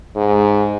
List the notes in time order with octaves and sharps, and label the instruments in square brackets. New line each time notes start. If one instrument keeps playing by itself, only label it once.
[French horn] G#2